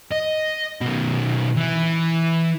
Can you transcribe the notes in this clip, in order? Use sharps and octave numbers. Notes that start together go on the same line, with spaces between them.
D#5
B2 D#3
E3